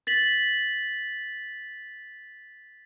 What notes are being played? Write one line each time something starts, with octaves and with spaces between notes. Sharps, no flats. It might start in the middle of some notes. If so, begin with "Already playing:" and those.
A6 B6 F#7